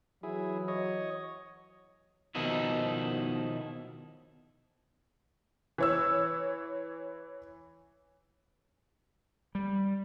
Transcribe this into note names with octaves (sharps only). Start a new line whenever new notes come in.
E3 F#3 E4 G#4
C#5 D#5
B2 D#3 F3 D#4 E4
E3 C#5 E6
G3